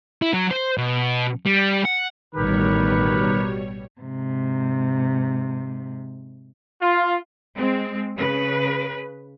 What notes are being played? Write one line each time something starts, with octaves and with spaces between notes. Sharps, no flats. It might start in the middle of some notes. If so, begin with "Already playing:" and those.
E4
F#3
C5
B2
G3
F#5
A1 B2 D#3 G3 G4 A#4 B4 C#5
G#2 C3
F4
G#3 C4
C#3 B4